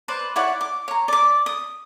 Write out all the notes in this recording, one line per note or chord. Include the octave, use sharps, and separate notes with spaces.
B4 C5 D5
E4 C#5 D5 F#5
D6
C#5 A#5
D5 D6
D#6